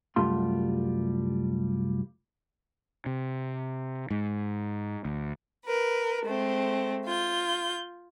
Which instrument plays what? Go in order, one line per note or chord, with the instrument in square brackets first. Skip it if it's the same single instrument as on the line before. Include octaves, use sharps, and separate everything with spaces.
[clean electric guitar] C2 F#2 G3 A3 F4 C6
[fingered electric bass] C3
G#2
D2
[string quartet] A#4 B4
G#3 A3 C4
F4 G6